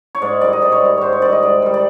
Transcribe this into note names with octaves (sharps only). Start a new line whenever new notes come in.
C#5
G#2 D5
D#3 G3 D5
D#5
G#2 D5
C#5
D#3 G3
G#2 C5 C#5
C#5
D#3 G3 D5
D#5
G#2 D5
D#3 G3
D5